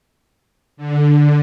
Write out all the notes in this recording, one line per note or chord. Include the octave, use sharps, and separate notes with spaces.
D3